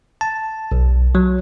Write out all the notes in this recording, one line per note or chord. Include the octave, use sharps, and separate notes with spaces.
A5
B1
F#3